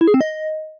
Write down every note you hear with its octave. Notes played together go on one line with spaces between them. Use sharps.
E4
G#4
C4
D#5